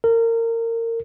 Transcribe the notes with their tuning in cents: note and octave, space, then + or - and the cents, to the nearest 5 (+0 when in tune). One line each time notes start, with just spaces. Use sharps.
A#4 -25